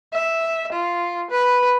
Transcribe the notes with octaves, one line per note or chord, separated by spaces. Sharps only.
E5
F4
B4